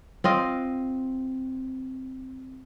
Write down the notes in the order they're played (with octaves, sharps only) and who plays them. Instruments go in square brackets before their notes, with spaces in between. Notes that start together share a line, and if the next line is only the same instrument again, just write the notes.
[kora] C4 F4 D#5